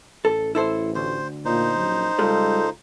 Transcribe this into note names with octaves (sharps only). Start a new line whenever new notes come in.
A1 A4
E4 A4 C5
D2 C5
A#2 D#4 C5
A#1 F#2
C#2 G3 G#3 F4 A4